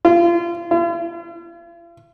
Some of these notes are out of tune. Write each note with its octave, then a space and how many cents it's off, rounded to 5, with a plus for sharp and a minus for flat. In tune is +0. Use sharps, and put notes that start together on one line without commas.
F4 -30
F4 -45